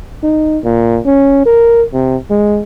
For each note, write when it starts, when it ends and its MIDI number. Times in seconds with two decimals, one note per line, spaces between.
0.23 0.58 63
0.64 0.99 46
1.06 1.42 61
1.46 1.83 70
1.93 2.16 48
2.30 2.62 56